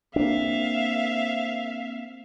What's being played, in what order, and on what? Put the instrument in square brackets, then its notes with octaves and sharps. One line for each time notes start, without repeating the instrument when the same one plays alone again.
[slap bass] A#3 C4 D4 [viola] E5 F5